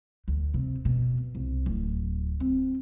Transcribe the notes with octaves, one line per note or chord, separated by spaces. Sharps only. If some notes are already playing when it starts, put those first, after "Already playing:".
D2
C3
B2
C2
D1
C4